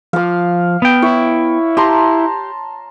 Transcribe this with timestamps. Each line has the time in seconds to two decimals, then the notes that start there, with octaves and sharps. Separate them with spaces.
0.13 F3 F5 D6
0.82 B3 G5
1.02 E4 C#5
1.77 G4 A5 A#5 C6